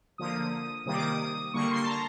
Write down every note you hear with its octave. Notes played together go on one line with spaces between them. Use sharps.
D3 F3 A#3 D#6
C3 D#3 G3 A#3 D#6
D6
D#6
D3 G3 A#3 C#6
C6
A5
A#5